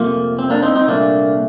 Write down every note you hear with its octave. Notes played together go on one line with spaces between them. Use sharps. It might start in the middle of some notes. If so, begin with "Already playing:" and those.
Already playing: F2 C3 F3 A3 A#3
C4
A#3 D4
C4 D#4
C4 D#4
C2 A#2 A3 A#3 D4